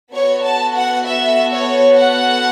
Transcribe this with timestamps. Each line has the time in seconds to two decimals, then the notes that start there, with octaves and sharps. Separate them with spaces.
0.13 B3 F#4 A4 C#5
0.43 A5
0.75 F#5
1.05 E5
1.52 C#5
1.98 F#5